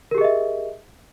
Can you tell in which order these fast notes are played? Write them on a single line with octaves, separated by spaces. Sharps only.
A#4 G4 G#4 D#5 E5